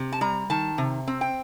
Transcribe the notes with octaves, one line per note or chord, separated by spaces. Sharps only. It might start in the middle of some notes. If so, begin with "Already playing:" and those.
Already playing: C3
A5
G3 A#5
D#3 A5
C3
C4
G5